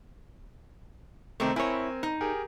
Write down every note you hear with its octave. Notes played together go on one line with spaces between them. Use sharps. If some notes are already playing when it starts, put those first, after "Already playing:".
C3 D#3 A3 C4 A#4
C4 E4 A#4 C#5 G#5
D#4
G4 G#4 A#4